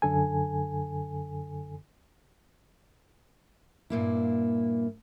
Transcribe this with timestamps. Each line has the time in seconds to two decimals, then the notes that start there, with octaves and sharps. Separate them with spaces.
0.02 F#2 D3 A4 G#5
3.90 G2 A#2 A#3 E4